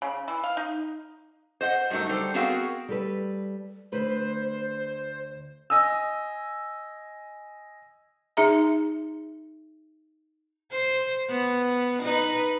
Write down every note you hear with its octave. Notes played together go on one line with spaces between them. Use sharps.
C#3
E3
F5
D#4
C5 D#5 F#5
G2 F#3 A3 D#4 A#4
G3 A4 C5
B3 C4 F#4 G#4 A#4 F5
G3 A4 B4
D2 B4 C5
D#5 G#5 D#6 E6
D#4 G#4 E5 A#5
C5
B3
D#4 B4